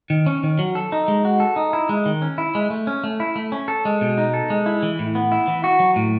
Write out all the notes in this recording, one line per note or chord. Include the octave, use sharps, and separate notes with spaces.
D#3
C#4
D#3
F#3
A4
D#4
G#3
F#4
A4
D#4
E4
G#3
D#3
C#4
E4
G#3
A3
C#4
A3
E4
A3
C#4
A4
G#3
B2
D#4
A4
G#3
E4
E3
A2
B3
E4
E3
F#4
F#3
A2